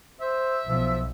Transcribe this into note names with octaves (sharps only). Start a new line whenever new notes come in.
C5 E5
B1 F3